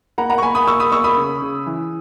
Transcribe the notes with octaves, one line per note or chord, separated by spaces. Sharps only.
A#3 F#5 A#5
F#5 A#5
C#6
A#3 G#5 B5
B5 D#6
A#3 C#6 E6
B5 D#6
A#3 C#6 E6
B5 D#6
C#3
C#3
E3